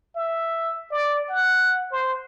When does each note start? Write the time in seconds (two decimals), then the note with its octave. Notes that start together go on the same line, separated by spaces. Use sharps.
0.15 E5
0.91 D5
1.29 F#5
1.91 C5